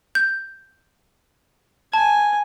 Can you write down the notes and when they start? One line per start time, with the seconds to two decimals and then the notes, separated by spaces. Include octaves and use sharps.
0.15 G6
1.93 G#5 A5